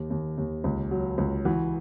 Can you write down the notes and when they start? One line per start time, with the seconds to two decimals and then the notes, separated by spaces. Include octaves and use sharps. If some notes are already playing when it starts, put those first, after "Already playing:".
Already playing: D#2
0.10 D#2
0.37 D#2
0.64 C#2
0.91 F#3
1.18 C#2
1.45 E3 F#4